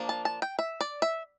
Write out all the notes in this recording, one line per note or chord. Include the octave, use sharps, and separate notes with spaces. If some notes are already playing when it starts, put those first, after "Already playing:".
Already playing: F3 A#3 D4
A5
A5
G5
E5
D5
E5